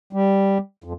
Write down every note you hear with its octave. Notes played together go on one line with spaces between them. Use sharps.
G3
F2